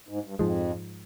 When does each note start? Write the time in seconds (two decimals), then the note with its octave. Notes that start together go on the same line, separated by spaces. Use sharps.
0.08 G#2
0.24 G2
0.39 F2 G#2 F3 G#3